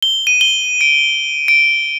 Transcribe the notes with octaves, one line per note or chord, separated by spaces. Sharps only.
G7
D#7
G7
D7
D7